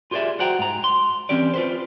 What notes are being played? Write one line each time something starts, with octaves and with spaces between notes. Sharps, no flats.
F4 G4 G#4 B4 D5 E5
F#4 C5 F#5 G5 A#5
G#2 A#5
C6
E3 C4 C#4 G4 D5
F4 B4 C5